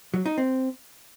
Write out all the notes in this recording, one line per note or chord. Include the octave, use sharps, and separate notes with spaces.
F#3
D#4
C4